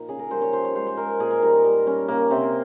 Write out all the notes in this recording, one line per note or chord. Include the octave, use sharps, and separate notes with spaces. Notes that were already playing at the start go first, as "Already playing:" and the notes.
Already playing: A#2 F3 D#4
C#3 G#4
A#4
G3 C5
C#5
F3 C5
C#5
G#3 C5
C5
G#3 A#4
A#2 G#4
A#4
G3 D#4
G3
G3 C#4
C#3 A#3
C3 C4